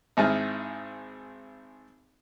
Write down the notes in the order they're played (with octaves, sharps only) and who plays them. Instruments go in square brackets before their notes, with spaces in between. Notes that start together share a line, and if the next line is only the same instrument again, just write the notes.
[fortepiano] G#1 G#2 E4 G#4 A5 F6